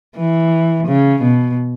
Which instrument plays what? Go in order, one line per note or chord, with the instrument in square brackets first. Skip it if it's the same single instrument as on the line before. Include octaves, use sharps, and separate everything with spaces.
[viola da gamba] E3
C#3
B2